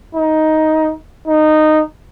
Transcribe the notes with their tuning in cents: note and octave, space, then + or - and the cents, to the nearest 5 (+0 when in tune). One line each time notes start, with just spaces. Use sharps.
D#4 +10
D#4 -15